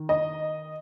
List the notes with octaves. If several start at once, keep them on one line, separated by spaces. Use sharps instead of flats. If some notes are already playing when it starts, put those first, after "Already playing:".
Already playing: D#3
D#5